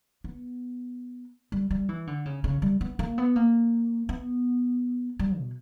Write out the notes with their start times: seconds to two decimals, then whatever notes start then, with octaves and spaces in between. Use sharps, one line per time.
0.24 B3
1.52 G3
1.71 G3
1.89 E3
2.07 D3
2.25 C#3
2.44 C#3
2.62 G3
2.81 B3
2.99 A#3
3.18 B3
3.36 A#3
4.09 B3
5.19 G3
5.38 B2